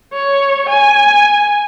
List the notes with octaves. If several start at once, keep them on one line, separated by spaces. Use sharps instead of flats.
C#5
G#5